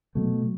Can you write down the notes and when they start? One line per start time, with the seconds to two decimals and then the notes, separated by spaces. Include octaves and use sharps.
0.15 B2 F#3 A3